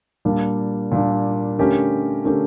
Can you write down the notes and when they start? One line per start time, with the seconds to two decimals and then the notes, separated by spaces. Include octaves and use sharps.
0.25 A#2 G3 A#3 D4
0.92 A#2 G3 A#3 D4
1.59 D3 A3 C#4 G4 A#4
2.25 D3 A3 C#4 G4 A#4